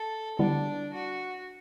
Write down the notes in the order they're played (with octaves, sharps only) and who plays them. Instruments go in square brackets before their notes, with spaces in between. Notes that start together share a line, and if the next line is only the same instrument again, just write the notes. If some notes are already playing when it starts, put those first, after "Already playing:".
Already playing: [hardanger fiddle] A4
[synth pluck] D3 G3 B3 E4 [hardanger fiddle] D4
[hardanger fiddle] F#4